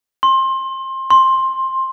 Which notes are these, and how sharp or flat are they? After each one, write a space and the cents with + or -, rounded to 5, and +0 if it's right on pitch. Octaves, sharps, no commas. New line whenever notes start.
C6 +25
C6 +15